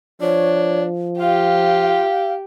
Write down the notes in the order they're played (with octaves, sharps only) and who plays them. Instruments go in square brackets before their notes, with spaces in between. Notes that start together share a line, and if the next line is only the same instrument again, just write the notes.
[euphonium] F3 [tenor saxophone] D4 [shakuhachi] C#5
[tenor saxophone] F4 [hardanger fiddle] G4 [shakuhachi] F5